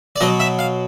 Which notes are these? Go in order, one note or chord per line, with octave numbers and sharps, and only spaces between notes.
D5
B2 F#3 D#5
E5
F5